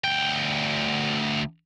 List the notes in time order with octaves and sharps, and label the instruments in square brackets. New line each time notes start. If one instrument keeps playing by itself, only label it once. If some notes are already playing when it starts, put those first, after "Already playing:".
[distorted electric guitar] D2 G5